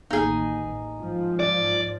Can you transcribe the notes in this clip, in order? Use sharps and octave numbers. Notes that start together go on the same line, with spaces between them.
A1 D#2 D#4 G#4
G#2 F3
D5